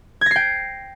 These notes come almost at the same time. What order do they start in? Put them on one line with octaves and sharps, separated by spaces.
G#6 A#6 C7 G5